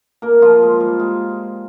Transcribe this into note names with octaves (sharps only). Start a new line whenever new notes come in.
A#3 A#4
F3 F4
G#3
G3
G#3